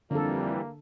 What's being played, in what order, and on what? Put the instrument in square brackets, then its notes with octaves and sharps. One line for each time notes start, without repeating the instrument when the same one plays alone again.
[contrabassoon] F2 [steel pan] D3 A4 [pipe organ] E3 G3 [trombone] A#3